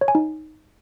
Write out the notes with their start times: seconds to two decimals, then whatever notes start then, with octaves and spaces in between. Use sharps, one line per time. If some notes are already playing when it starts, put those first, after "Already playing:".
0.01 C#5
0.08 G#5
0.15 D#4